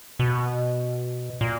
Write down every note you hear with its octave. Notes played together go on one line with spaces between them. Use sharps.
B2
A#2